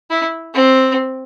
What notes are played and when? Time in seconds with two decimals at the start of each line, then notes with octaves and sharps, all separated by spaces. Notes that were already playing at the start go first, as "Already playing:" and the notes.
0.10 E4
0.54 C4